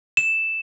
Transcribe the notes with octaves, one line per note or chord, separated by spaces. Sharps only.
E7